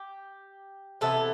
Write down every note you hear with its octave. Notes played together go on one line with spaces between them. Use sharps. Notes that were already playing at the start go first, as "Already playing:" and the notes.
Already playing: G4
C3 E3 B3 A4